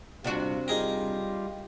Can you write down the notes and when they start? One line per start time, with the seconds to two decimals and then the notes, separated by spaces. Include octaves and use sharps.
0.24 C3 G3 D4 F4 F#4
0.68 G3 D#4 F4 G4 G#4 A#4